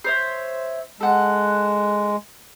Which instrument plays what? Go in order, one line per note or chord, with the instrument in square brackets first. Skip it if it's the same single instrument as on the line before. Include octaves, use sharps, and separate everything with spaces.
[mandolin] C5 C#5 E5
[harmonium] G#3 [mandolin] A4 F#5